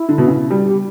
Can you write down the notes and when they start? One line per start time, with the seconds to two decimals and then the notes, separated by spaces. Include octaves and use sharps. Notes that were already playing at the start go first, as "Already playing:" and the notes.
Already playing: E4
0.09 D3
0.18 B2
0.27 C#3
0.50 G3
0.64 G4